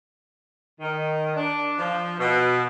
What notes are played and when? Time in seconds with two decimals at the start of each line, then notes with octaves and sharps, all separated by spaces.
0.81 D#3
1.35 D4
1.78 F3
2.19 B2